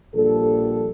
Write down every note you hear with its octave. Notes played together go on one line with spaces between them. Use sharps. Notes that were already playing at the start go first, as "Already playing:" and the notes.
A#1 F3 G3 A4